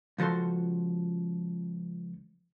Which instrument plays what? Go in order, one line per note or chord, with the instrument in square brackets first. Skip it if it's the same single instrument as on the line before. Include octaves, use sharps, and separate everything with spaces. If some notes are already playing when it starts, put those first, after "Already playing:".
[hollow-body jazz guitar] C#2 F3 F#4 A4 C6